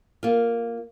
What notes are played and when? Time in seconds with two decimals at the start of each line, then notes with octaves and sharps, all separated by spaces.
0.23 A#3 F4